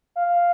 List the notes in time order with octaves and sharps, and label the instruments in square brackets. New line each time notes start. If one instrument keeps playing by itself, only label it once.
[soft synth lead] F5